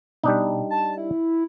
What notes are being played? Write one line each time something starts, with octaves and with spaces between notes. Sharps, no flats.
B2 G3 D4 D#4
A5
E4